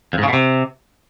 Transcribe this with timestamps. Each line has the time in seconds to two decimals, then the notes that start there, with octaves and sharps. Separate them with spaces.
0.13 F2
0.18 G#2
0.23 C#3
0.28 B2
0.33 C3